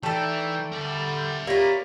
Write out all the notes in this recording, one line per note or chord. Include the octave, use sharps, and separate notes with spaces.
E3 A3 D#4 A4 D5 G5
D3 G3 A#4 E5
A#3 F4 G4 C#5 D5 B5